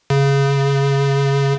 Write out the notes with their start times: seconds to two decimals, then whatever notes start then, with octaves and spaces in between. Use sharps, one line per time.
0.10 C#3